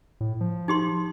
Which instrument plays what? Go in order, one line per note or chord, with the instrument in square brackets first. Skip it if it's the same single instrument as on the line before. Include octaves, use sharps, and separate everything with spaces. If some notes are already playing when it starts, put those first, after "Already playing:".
[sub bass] A2
F3
[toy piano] D#4 G4 C6